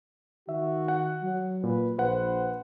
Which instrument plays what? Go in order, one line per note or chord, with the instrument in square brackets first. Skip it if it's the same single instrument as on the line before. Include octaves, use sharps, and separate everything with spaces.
[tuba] D#3 [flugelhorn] F#4 [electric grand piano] E5
[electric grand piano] F#5
[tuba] F#3
[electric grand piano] A#2 [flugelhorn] B4
[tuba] A#1 [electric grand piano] B4 F#5 [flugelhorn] C5